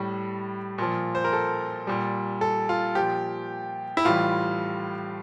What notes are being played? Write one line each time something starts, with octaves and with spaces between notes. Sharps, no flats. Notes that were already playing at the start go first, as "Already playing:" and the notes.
Already playing: A2 G3
A#2 F3
C5
A#4
A4
A#2 G3
A4
F4
A#2 F3 G4
E4
A2 E3 G3 F4